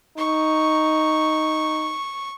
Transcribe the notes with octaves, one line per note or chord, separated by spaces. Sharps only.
D#4 C#6